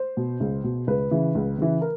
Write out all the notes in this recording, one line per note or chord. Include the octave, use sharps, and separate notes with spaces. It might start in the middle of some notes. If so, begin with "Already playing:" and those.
Already playing: C5
B2
C#2
B2
C#2 B4
C#3 E3
C#2
C#3 E3
A#4